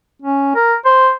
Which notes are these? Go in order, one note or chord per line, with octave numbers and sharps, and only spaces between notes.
C#4
A#4
C5